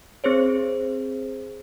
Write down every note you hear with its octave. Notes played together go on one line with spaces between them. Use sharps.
C4 G#4 C5 C#5